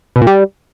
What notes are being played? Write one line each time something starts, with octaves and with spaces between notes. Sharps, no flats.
B2
A#2
G3